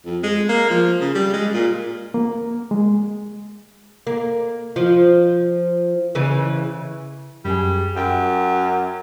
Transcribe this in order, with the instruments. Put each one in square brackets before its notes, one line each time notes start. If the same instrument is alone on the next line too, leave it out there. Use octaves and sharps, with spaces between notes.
[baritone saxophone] F2
G#3
A#3
F3
C#3
G3
G#3
A#2
[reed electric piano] A#3
G#3
[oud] A#3
F3 F4
C#3 E3
[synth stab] F#2 G#4 [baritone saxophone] G3
[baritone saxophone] F#2 [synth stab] G5